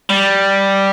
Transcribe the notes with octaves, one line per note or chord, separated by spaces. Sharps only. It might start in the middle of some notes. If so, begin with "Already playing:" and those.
G3